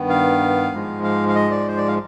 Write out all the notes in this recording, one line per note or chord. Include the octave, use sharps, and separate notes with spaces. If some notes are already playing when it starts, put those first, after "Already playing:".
Already playing: G2 D#3 B3
F5
G#2 F3 G#3
F5
F5
D#5
D5
C5
D5
F5